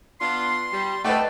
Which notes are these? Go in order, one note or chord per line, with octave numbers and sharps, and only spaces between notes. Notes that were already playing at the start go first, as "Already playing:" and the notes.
B3 D4 F4 C6 C7
G3
A3 B4 D5 D#5 F#5 G5 A5